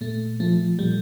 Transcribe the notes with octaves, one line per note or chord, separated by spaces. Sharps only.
A#2 A3
F3 A3
A#2 G3